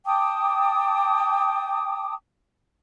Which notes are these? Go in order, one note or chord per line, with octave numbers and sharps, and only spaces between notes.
G5 A5 D6 D#6